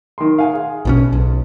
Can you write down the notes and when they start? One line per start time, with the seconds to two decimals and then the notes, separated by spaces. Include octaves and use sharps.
0.18 D#3 C6
0.38 F5 F#5 G#5
0.54 G#4
0.85 A#1 B2 C#4
1.13 B1